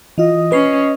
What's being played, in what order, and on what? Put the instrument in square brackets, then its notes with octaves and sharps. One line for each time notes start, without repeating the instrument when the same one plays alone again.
[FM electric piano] E3 F4 [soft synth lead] D#5
[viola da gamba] C#4 [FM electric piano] B4 C7